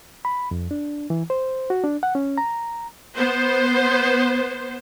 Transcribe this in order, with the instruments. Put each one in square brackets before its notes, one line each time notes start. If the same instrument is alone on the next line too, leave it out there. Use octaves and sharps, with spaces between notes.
[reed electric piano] B5
F2
D4
E3
C5
F#4
D4
F#5
C#4
A#5
[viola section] B3 C5